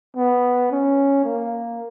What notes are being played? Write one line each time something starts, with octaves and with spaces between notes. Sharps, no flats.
B3
C#4
A#3